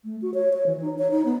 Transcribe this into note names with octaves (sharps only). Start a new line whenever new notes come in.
A3
F#4
C#5
C#5
E3
D#4
C#5
D#4
B3